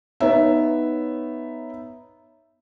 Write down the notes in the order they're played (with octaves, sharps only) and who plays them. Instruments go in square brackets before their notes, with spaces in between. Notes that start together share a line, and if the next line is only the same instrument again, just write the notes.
[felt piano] B3 D#4 C#5 E5